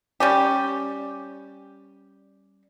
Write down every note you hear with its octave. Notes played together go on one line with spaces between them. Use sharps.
G3 C#4 G4